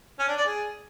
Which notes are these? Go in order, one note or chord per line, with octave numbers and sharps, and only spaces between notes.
C#4
D4
D5
G#4